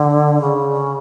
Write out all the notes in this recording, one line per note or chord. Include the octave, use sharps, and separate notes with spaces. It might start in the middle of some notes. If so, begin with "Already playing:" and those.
Already playing: D3
C#3